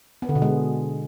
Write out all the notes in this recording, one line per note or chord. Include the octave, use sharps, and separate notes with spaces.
B3
D3
B2
G#3